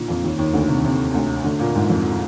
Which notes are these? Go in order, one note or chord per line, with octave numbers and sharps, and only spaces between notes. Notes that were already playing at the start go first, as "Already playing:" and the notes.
Already playing: A#2 D3 D#3
F2 F3
D#2 D#3
D#2 D#3
D2 D3
C3
C3
D2 D3
D2 D3
A#2 A#3
G#2 G#3
F2 F3